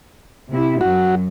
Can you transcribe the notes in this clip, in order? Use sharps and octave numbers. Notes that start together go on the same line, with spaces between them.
C3 E4
F#2 F#3 F#4